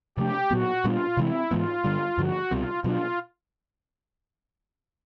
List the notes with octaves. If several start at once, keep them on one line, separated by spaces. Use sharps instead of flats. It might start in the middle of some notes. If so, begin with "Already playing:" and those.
C3 F3 A3 D4 G4
A#2 F#3 B3 F#4
A#2 G3 B3 D4 F4
C3 E3 G#3 C4 E4
G#2 E3 G#3 B3 F4
G2 D3 G3
G2 D3 F3 F#4
C2 B2 G3 C4 F4
B2 F#3 A#3 D4 F4